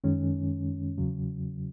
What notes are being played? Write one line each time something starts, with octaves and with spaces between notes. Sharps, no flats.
F#2 D#3 G#3 C#4
E2 C#3 F#3